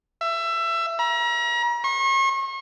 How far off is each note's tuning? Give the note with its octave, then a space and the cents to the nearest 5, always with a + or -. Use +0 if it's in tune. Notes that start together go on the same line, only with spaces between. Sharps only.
E5 +20
A#5 +40
C#6 -40